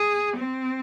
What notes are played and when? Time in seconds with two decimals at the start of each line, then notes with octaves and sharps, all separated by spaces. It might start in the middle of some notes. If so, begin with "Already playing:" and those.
Already playing: G#4
0.36 C4